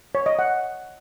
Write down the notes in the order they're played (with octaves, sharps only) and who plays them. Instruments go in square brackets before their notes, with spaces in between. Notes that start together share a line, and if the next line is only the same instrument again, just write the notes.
[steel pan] C#5
D#5
F#5